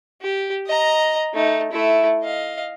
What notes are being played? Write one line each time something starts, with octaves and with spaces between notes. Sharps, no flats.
G4
D#5 A#5
A3 D#4
A3 E4
D#5 F5